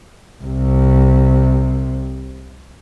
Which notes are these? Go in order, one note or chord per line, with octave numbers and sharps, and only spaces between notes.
C2 C3